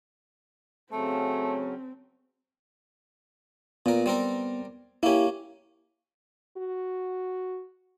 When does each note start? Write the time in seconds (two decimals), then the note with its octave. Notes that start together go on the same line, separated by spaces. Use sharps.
0.92 C#3 F#3 A3 C4 C#4 A5
3.86 A#2 B3 A#4
4.06 G3 C4 A#4
5.03 A#3 C#4 E4 G4
6.57 F#4